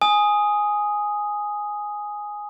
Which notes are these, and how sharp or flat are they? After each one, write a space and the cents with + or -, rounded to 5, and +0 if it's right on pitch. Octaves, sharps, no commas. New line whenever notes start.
G#5 +0 D#6 +0